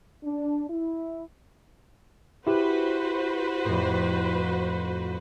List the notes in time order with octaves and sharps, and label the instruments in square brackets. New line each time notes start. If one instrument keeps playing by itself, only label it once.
[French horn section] D4
E4
[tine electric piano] E4 G4 [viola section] F#4 B4 C5
[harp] F2 A2